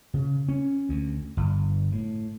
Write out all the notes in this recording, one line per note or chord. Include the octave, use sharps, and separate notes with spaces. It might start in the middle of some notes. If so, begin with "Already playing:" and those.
C#3
C#4
D2
G1
A2